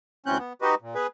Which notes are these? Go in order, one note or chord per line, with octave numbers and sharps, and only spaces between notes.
D2 E3 C4 C#4 F#6 G6
B3
D#4 F#4 G4 B4 D#5
A#2
B3 G#4 B4